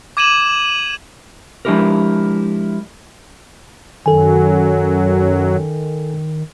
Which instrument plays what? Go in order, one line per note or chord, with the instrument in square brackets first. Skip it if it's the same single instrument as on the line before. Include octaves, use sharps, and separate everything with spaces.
[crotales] D6 G#6 D#7 E7 F#7
[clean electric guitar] F3 G#3 D4 E4 G4 A#4
[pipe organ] F#2 F#3 [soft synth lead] D#3 [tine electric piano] A4 G#5